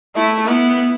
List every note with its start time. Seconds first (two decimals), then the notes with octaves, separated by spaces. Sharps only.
0.15 A3 E4
0.47 B3 E4